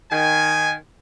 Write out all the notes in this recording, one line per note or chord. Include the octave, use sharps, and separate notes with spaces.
D#3 G#5